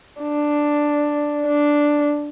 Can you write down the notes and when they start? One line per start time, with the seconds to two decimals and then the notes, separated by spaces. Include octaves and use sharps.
0.22 D4
1.46 D4